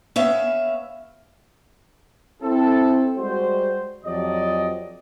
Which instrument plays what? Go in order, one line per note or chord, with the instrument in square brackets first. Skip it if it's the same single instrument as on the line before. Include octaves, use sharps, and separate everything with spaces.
[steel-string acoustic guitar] B3 C#4 E5 F5
[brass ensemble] C4 E4 A4
G3 G#3 F#4 C5
F2 F3 F#3 G4 D5 D#5